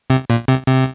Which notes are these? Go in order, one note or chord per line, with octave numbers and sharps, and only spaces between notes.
C3
A#2
C3
C3